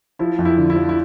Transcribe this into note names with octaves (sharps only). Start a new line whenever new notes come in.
F3 E4
F2
E4
D3
E4
F3
E4